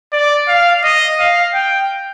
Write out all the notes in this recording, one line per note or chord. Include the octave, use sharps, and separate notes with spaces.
D5
F5
D#5
F5
G5